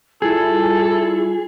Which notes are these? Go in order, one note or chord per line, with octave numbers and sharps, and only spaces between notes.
G3 E4 F4 G#4 A4